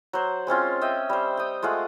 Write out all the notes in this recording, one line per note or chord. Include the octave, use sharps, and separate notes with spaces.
F#3 C5
G#3 C4 C#4 F4
D#5 E5 G5
G3 C5
G5 D#6
G#3 A3 F4 F#5